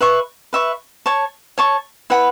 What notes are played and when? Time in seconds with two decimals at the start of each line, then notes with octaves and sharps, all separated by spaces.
0.01 B4 E5 C#6
0.53 B4 E5 C#6
1.06 C#5 A5 C#6
1.58 C#5 A5 C#6
2.10 E4 B4 F#5 B5